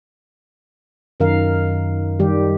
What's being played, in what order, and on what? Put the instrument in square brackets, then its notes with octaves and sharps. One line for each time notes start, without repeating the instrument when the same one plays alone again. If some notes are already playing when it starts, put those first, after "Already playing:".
[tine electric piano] F#2 [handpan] D#3 A#4 F5
[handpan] D#3 G3 G4